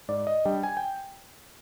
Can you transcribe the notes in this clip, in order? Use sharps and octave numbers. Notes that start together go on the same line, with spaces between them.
G#2 D5
D#5
G3 D4 G5
G#5
G5